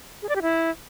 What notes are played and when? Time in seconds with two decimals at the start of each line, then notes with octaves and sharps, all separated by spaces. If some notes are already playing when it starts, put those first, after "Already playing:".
0.22 G#4
0.29 D5
0.36 G4
0.42 E4